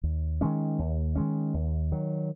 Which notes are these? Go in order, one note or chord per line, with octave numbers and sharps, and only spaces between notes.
D#2
D#3 G#3 C#4
D#2
D#3 G#3 C#4
D#2
D#3 F#3